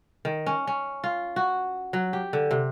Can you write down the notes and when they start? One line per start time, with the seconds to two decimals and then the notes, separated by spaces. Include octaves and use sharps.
0.25 D#3
0.46 C#4
0.67 C#4
1.04 F4
1.36 F#4
1.93 F#3
2.13 G4
2.33 D3
2.51 C3